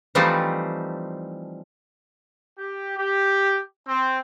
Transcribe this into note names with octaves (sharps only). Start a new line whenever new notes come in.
E3 F3 G3 A3 C4 D#4
G4
G4
C4